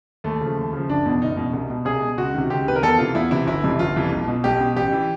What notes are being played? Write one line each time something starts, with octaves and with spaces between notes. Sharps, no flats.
D#2 A3
C#3 F3
D#2
C#3 F3
F#1 D4
E2 B2
F#1 D#4
E2 B2
C2
B2
C2 G#4
B2
C#2 F#4
C3 D#3
C#2 G4
C3 D#3 B4
A#4
E2 A4
C3 E3 F4
E2 E4
C3 E3 E4
G1 E4
F2 C3 E3
G1 F4
F2 C3 E3
B1
B2
B1 G4
B2
A1 G4
E3